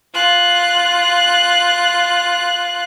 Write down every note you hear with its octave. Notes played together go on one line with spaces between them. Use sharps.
F4 F#6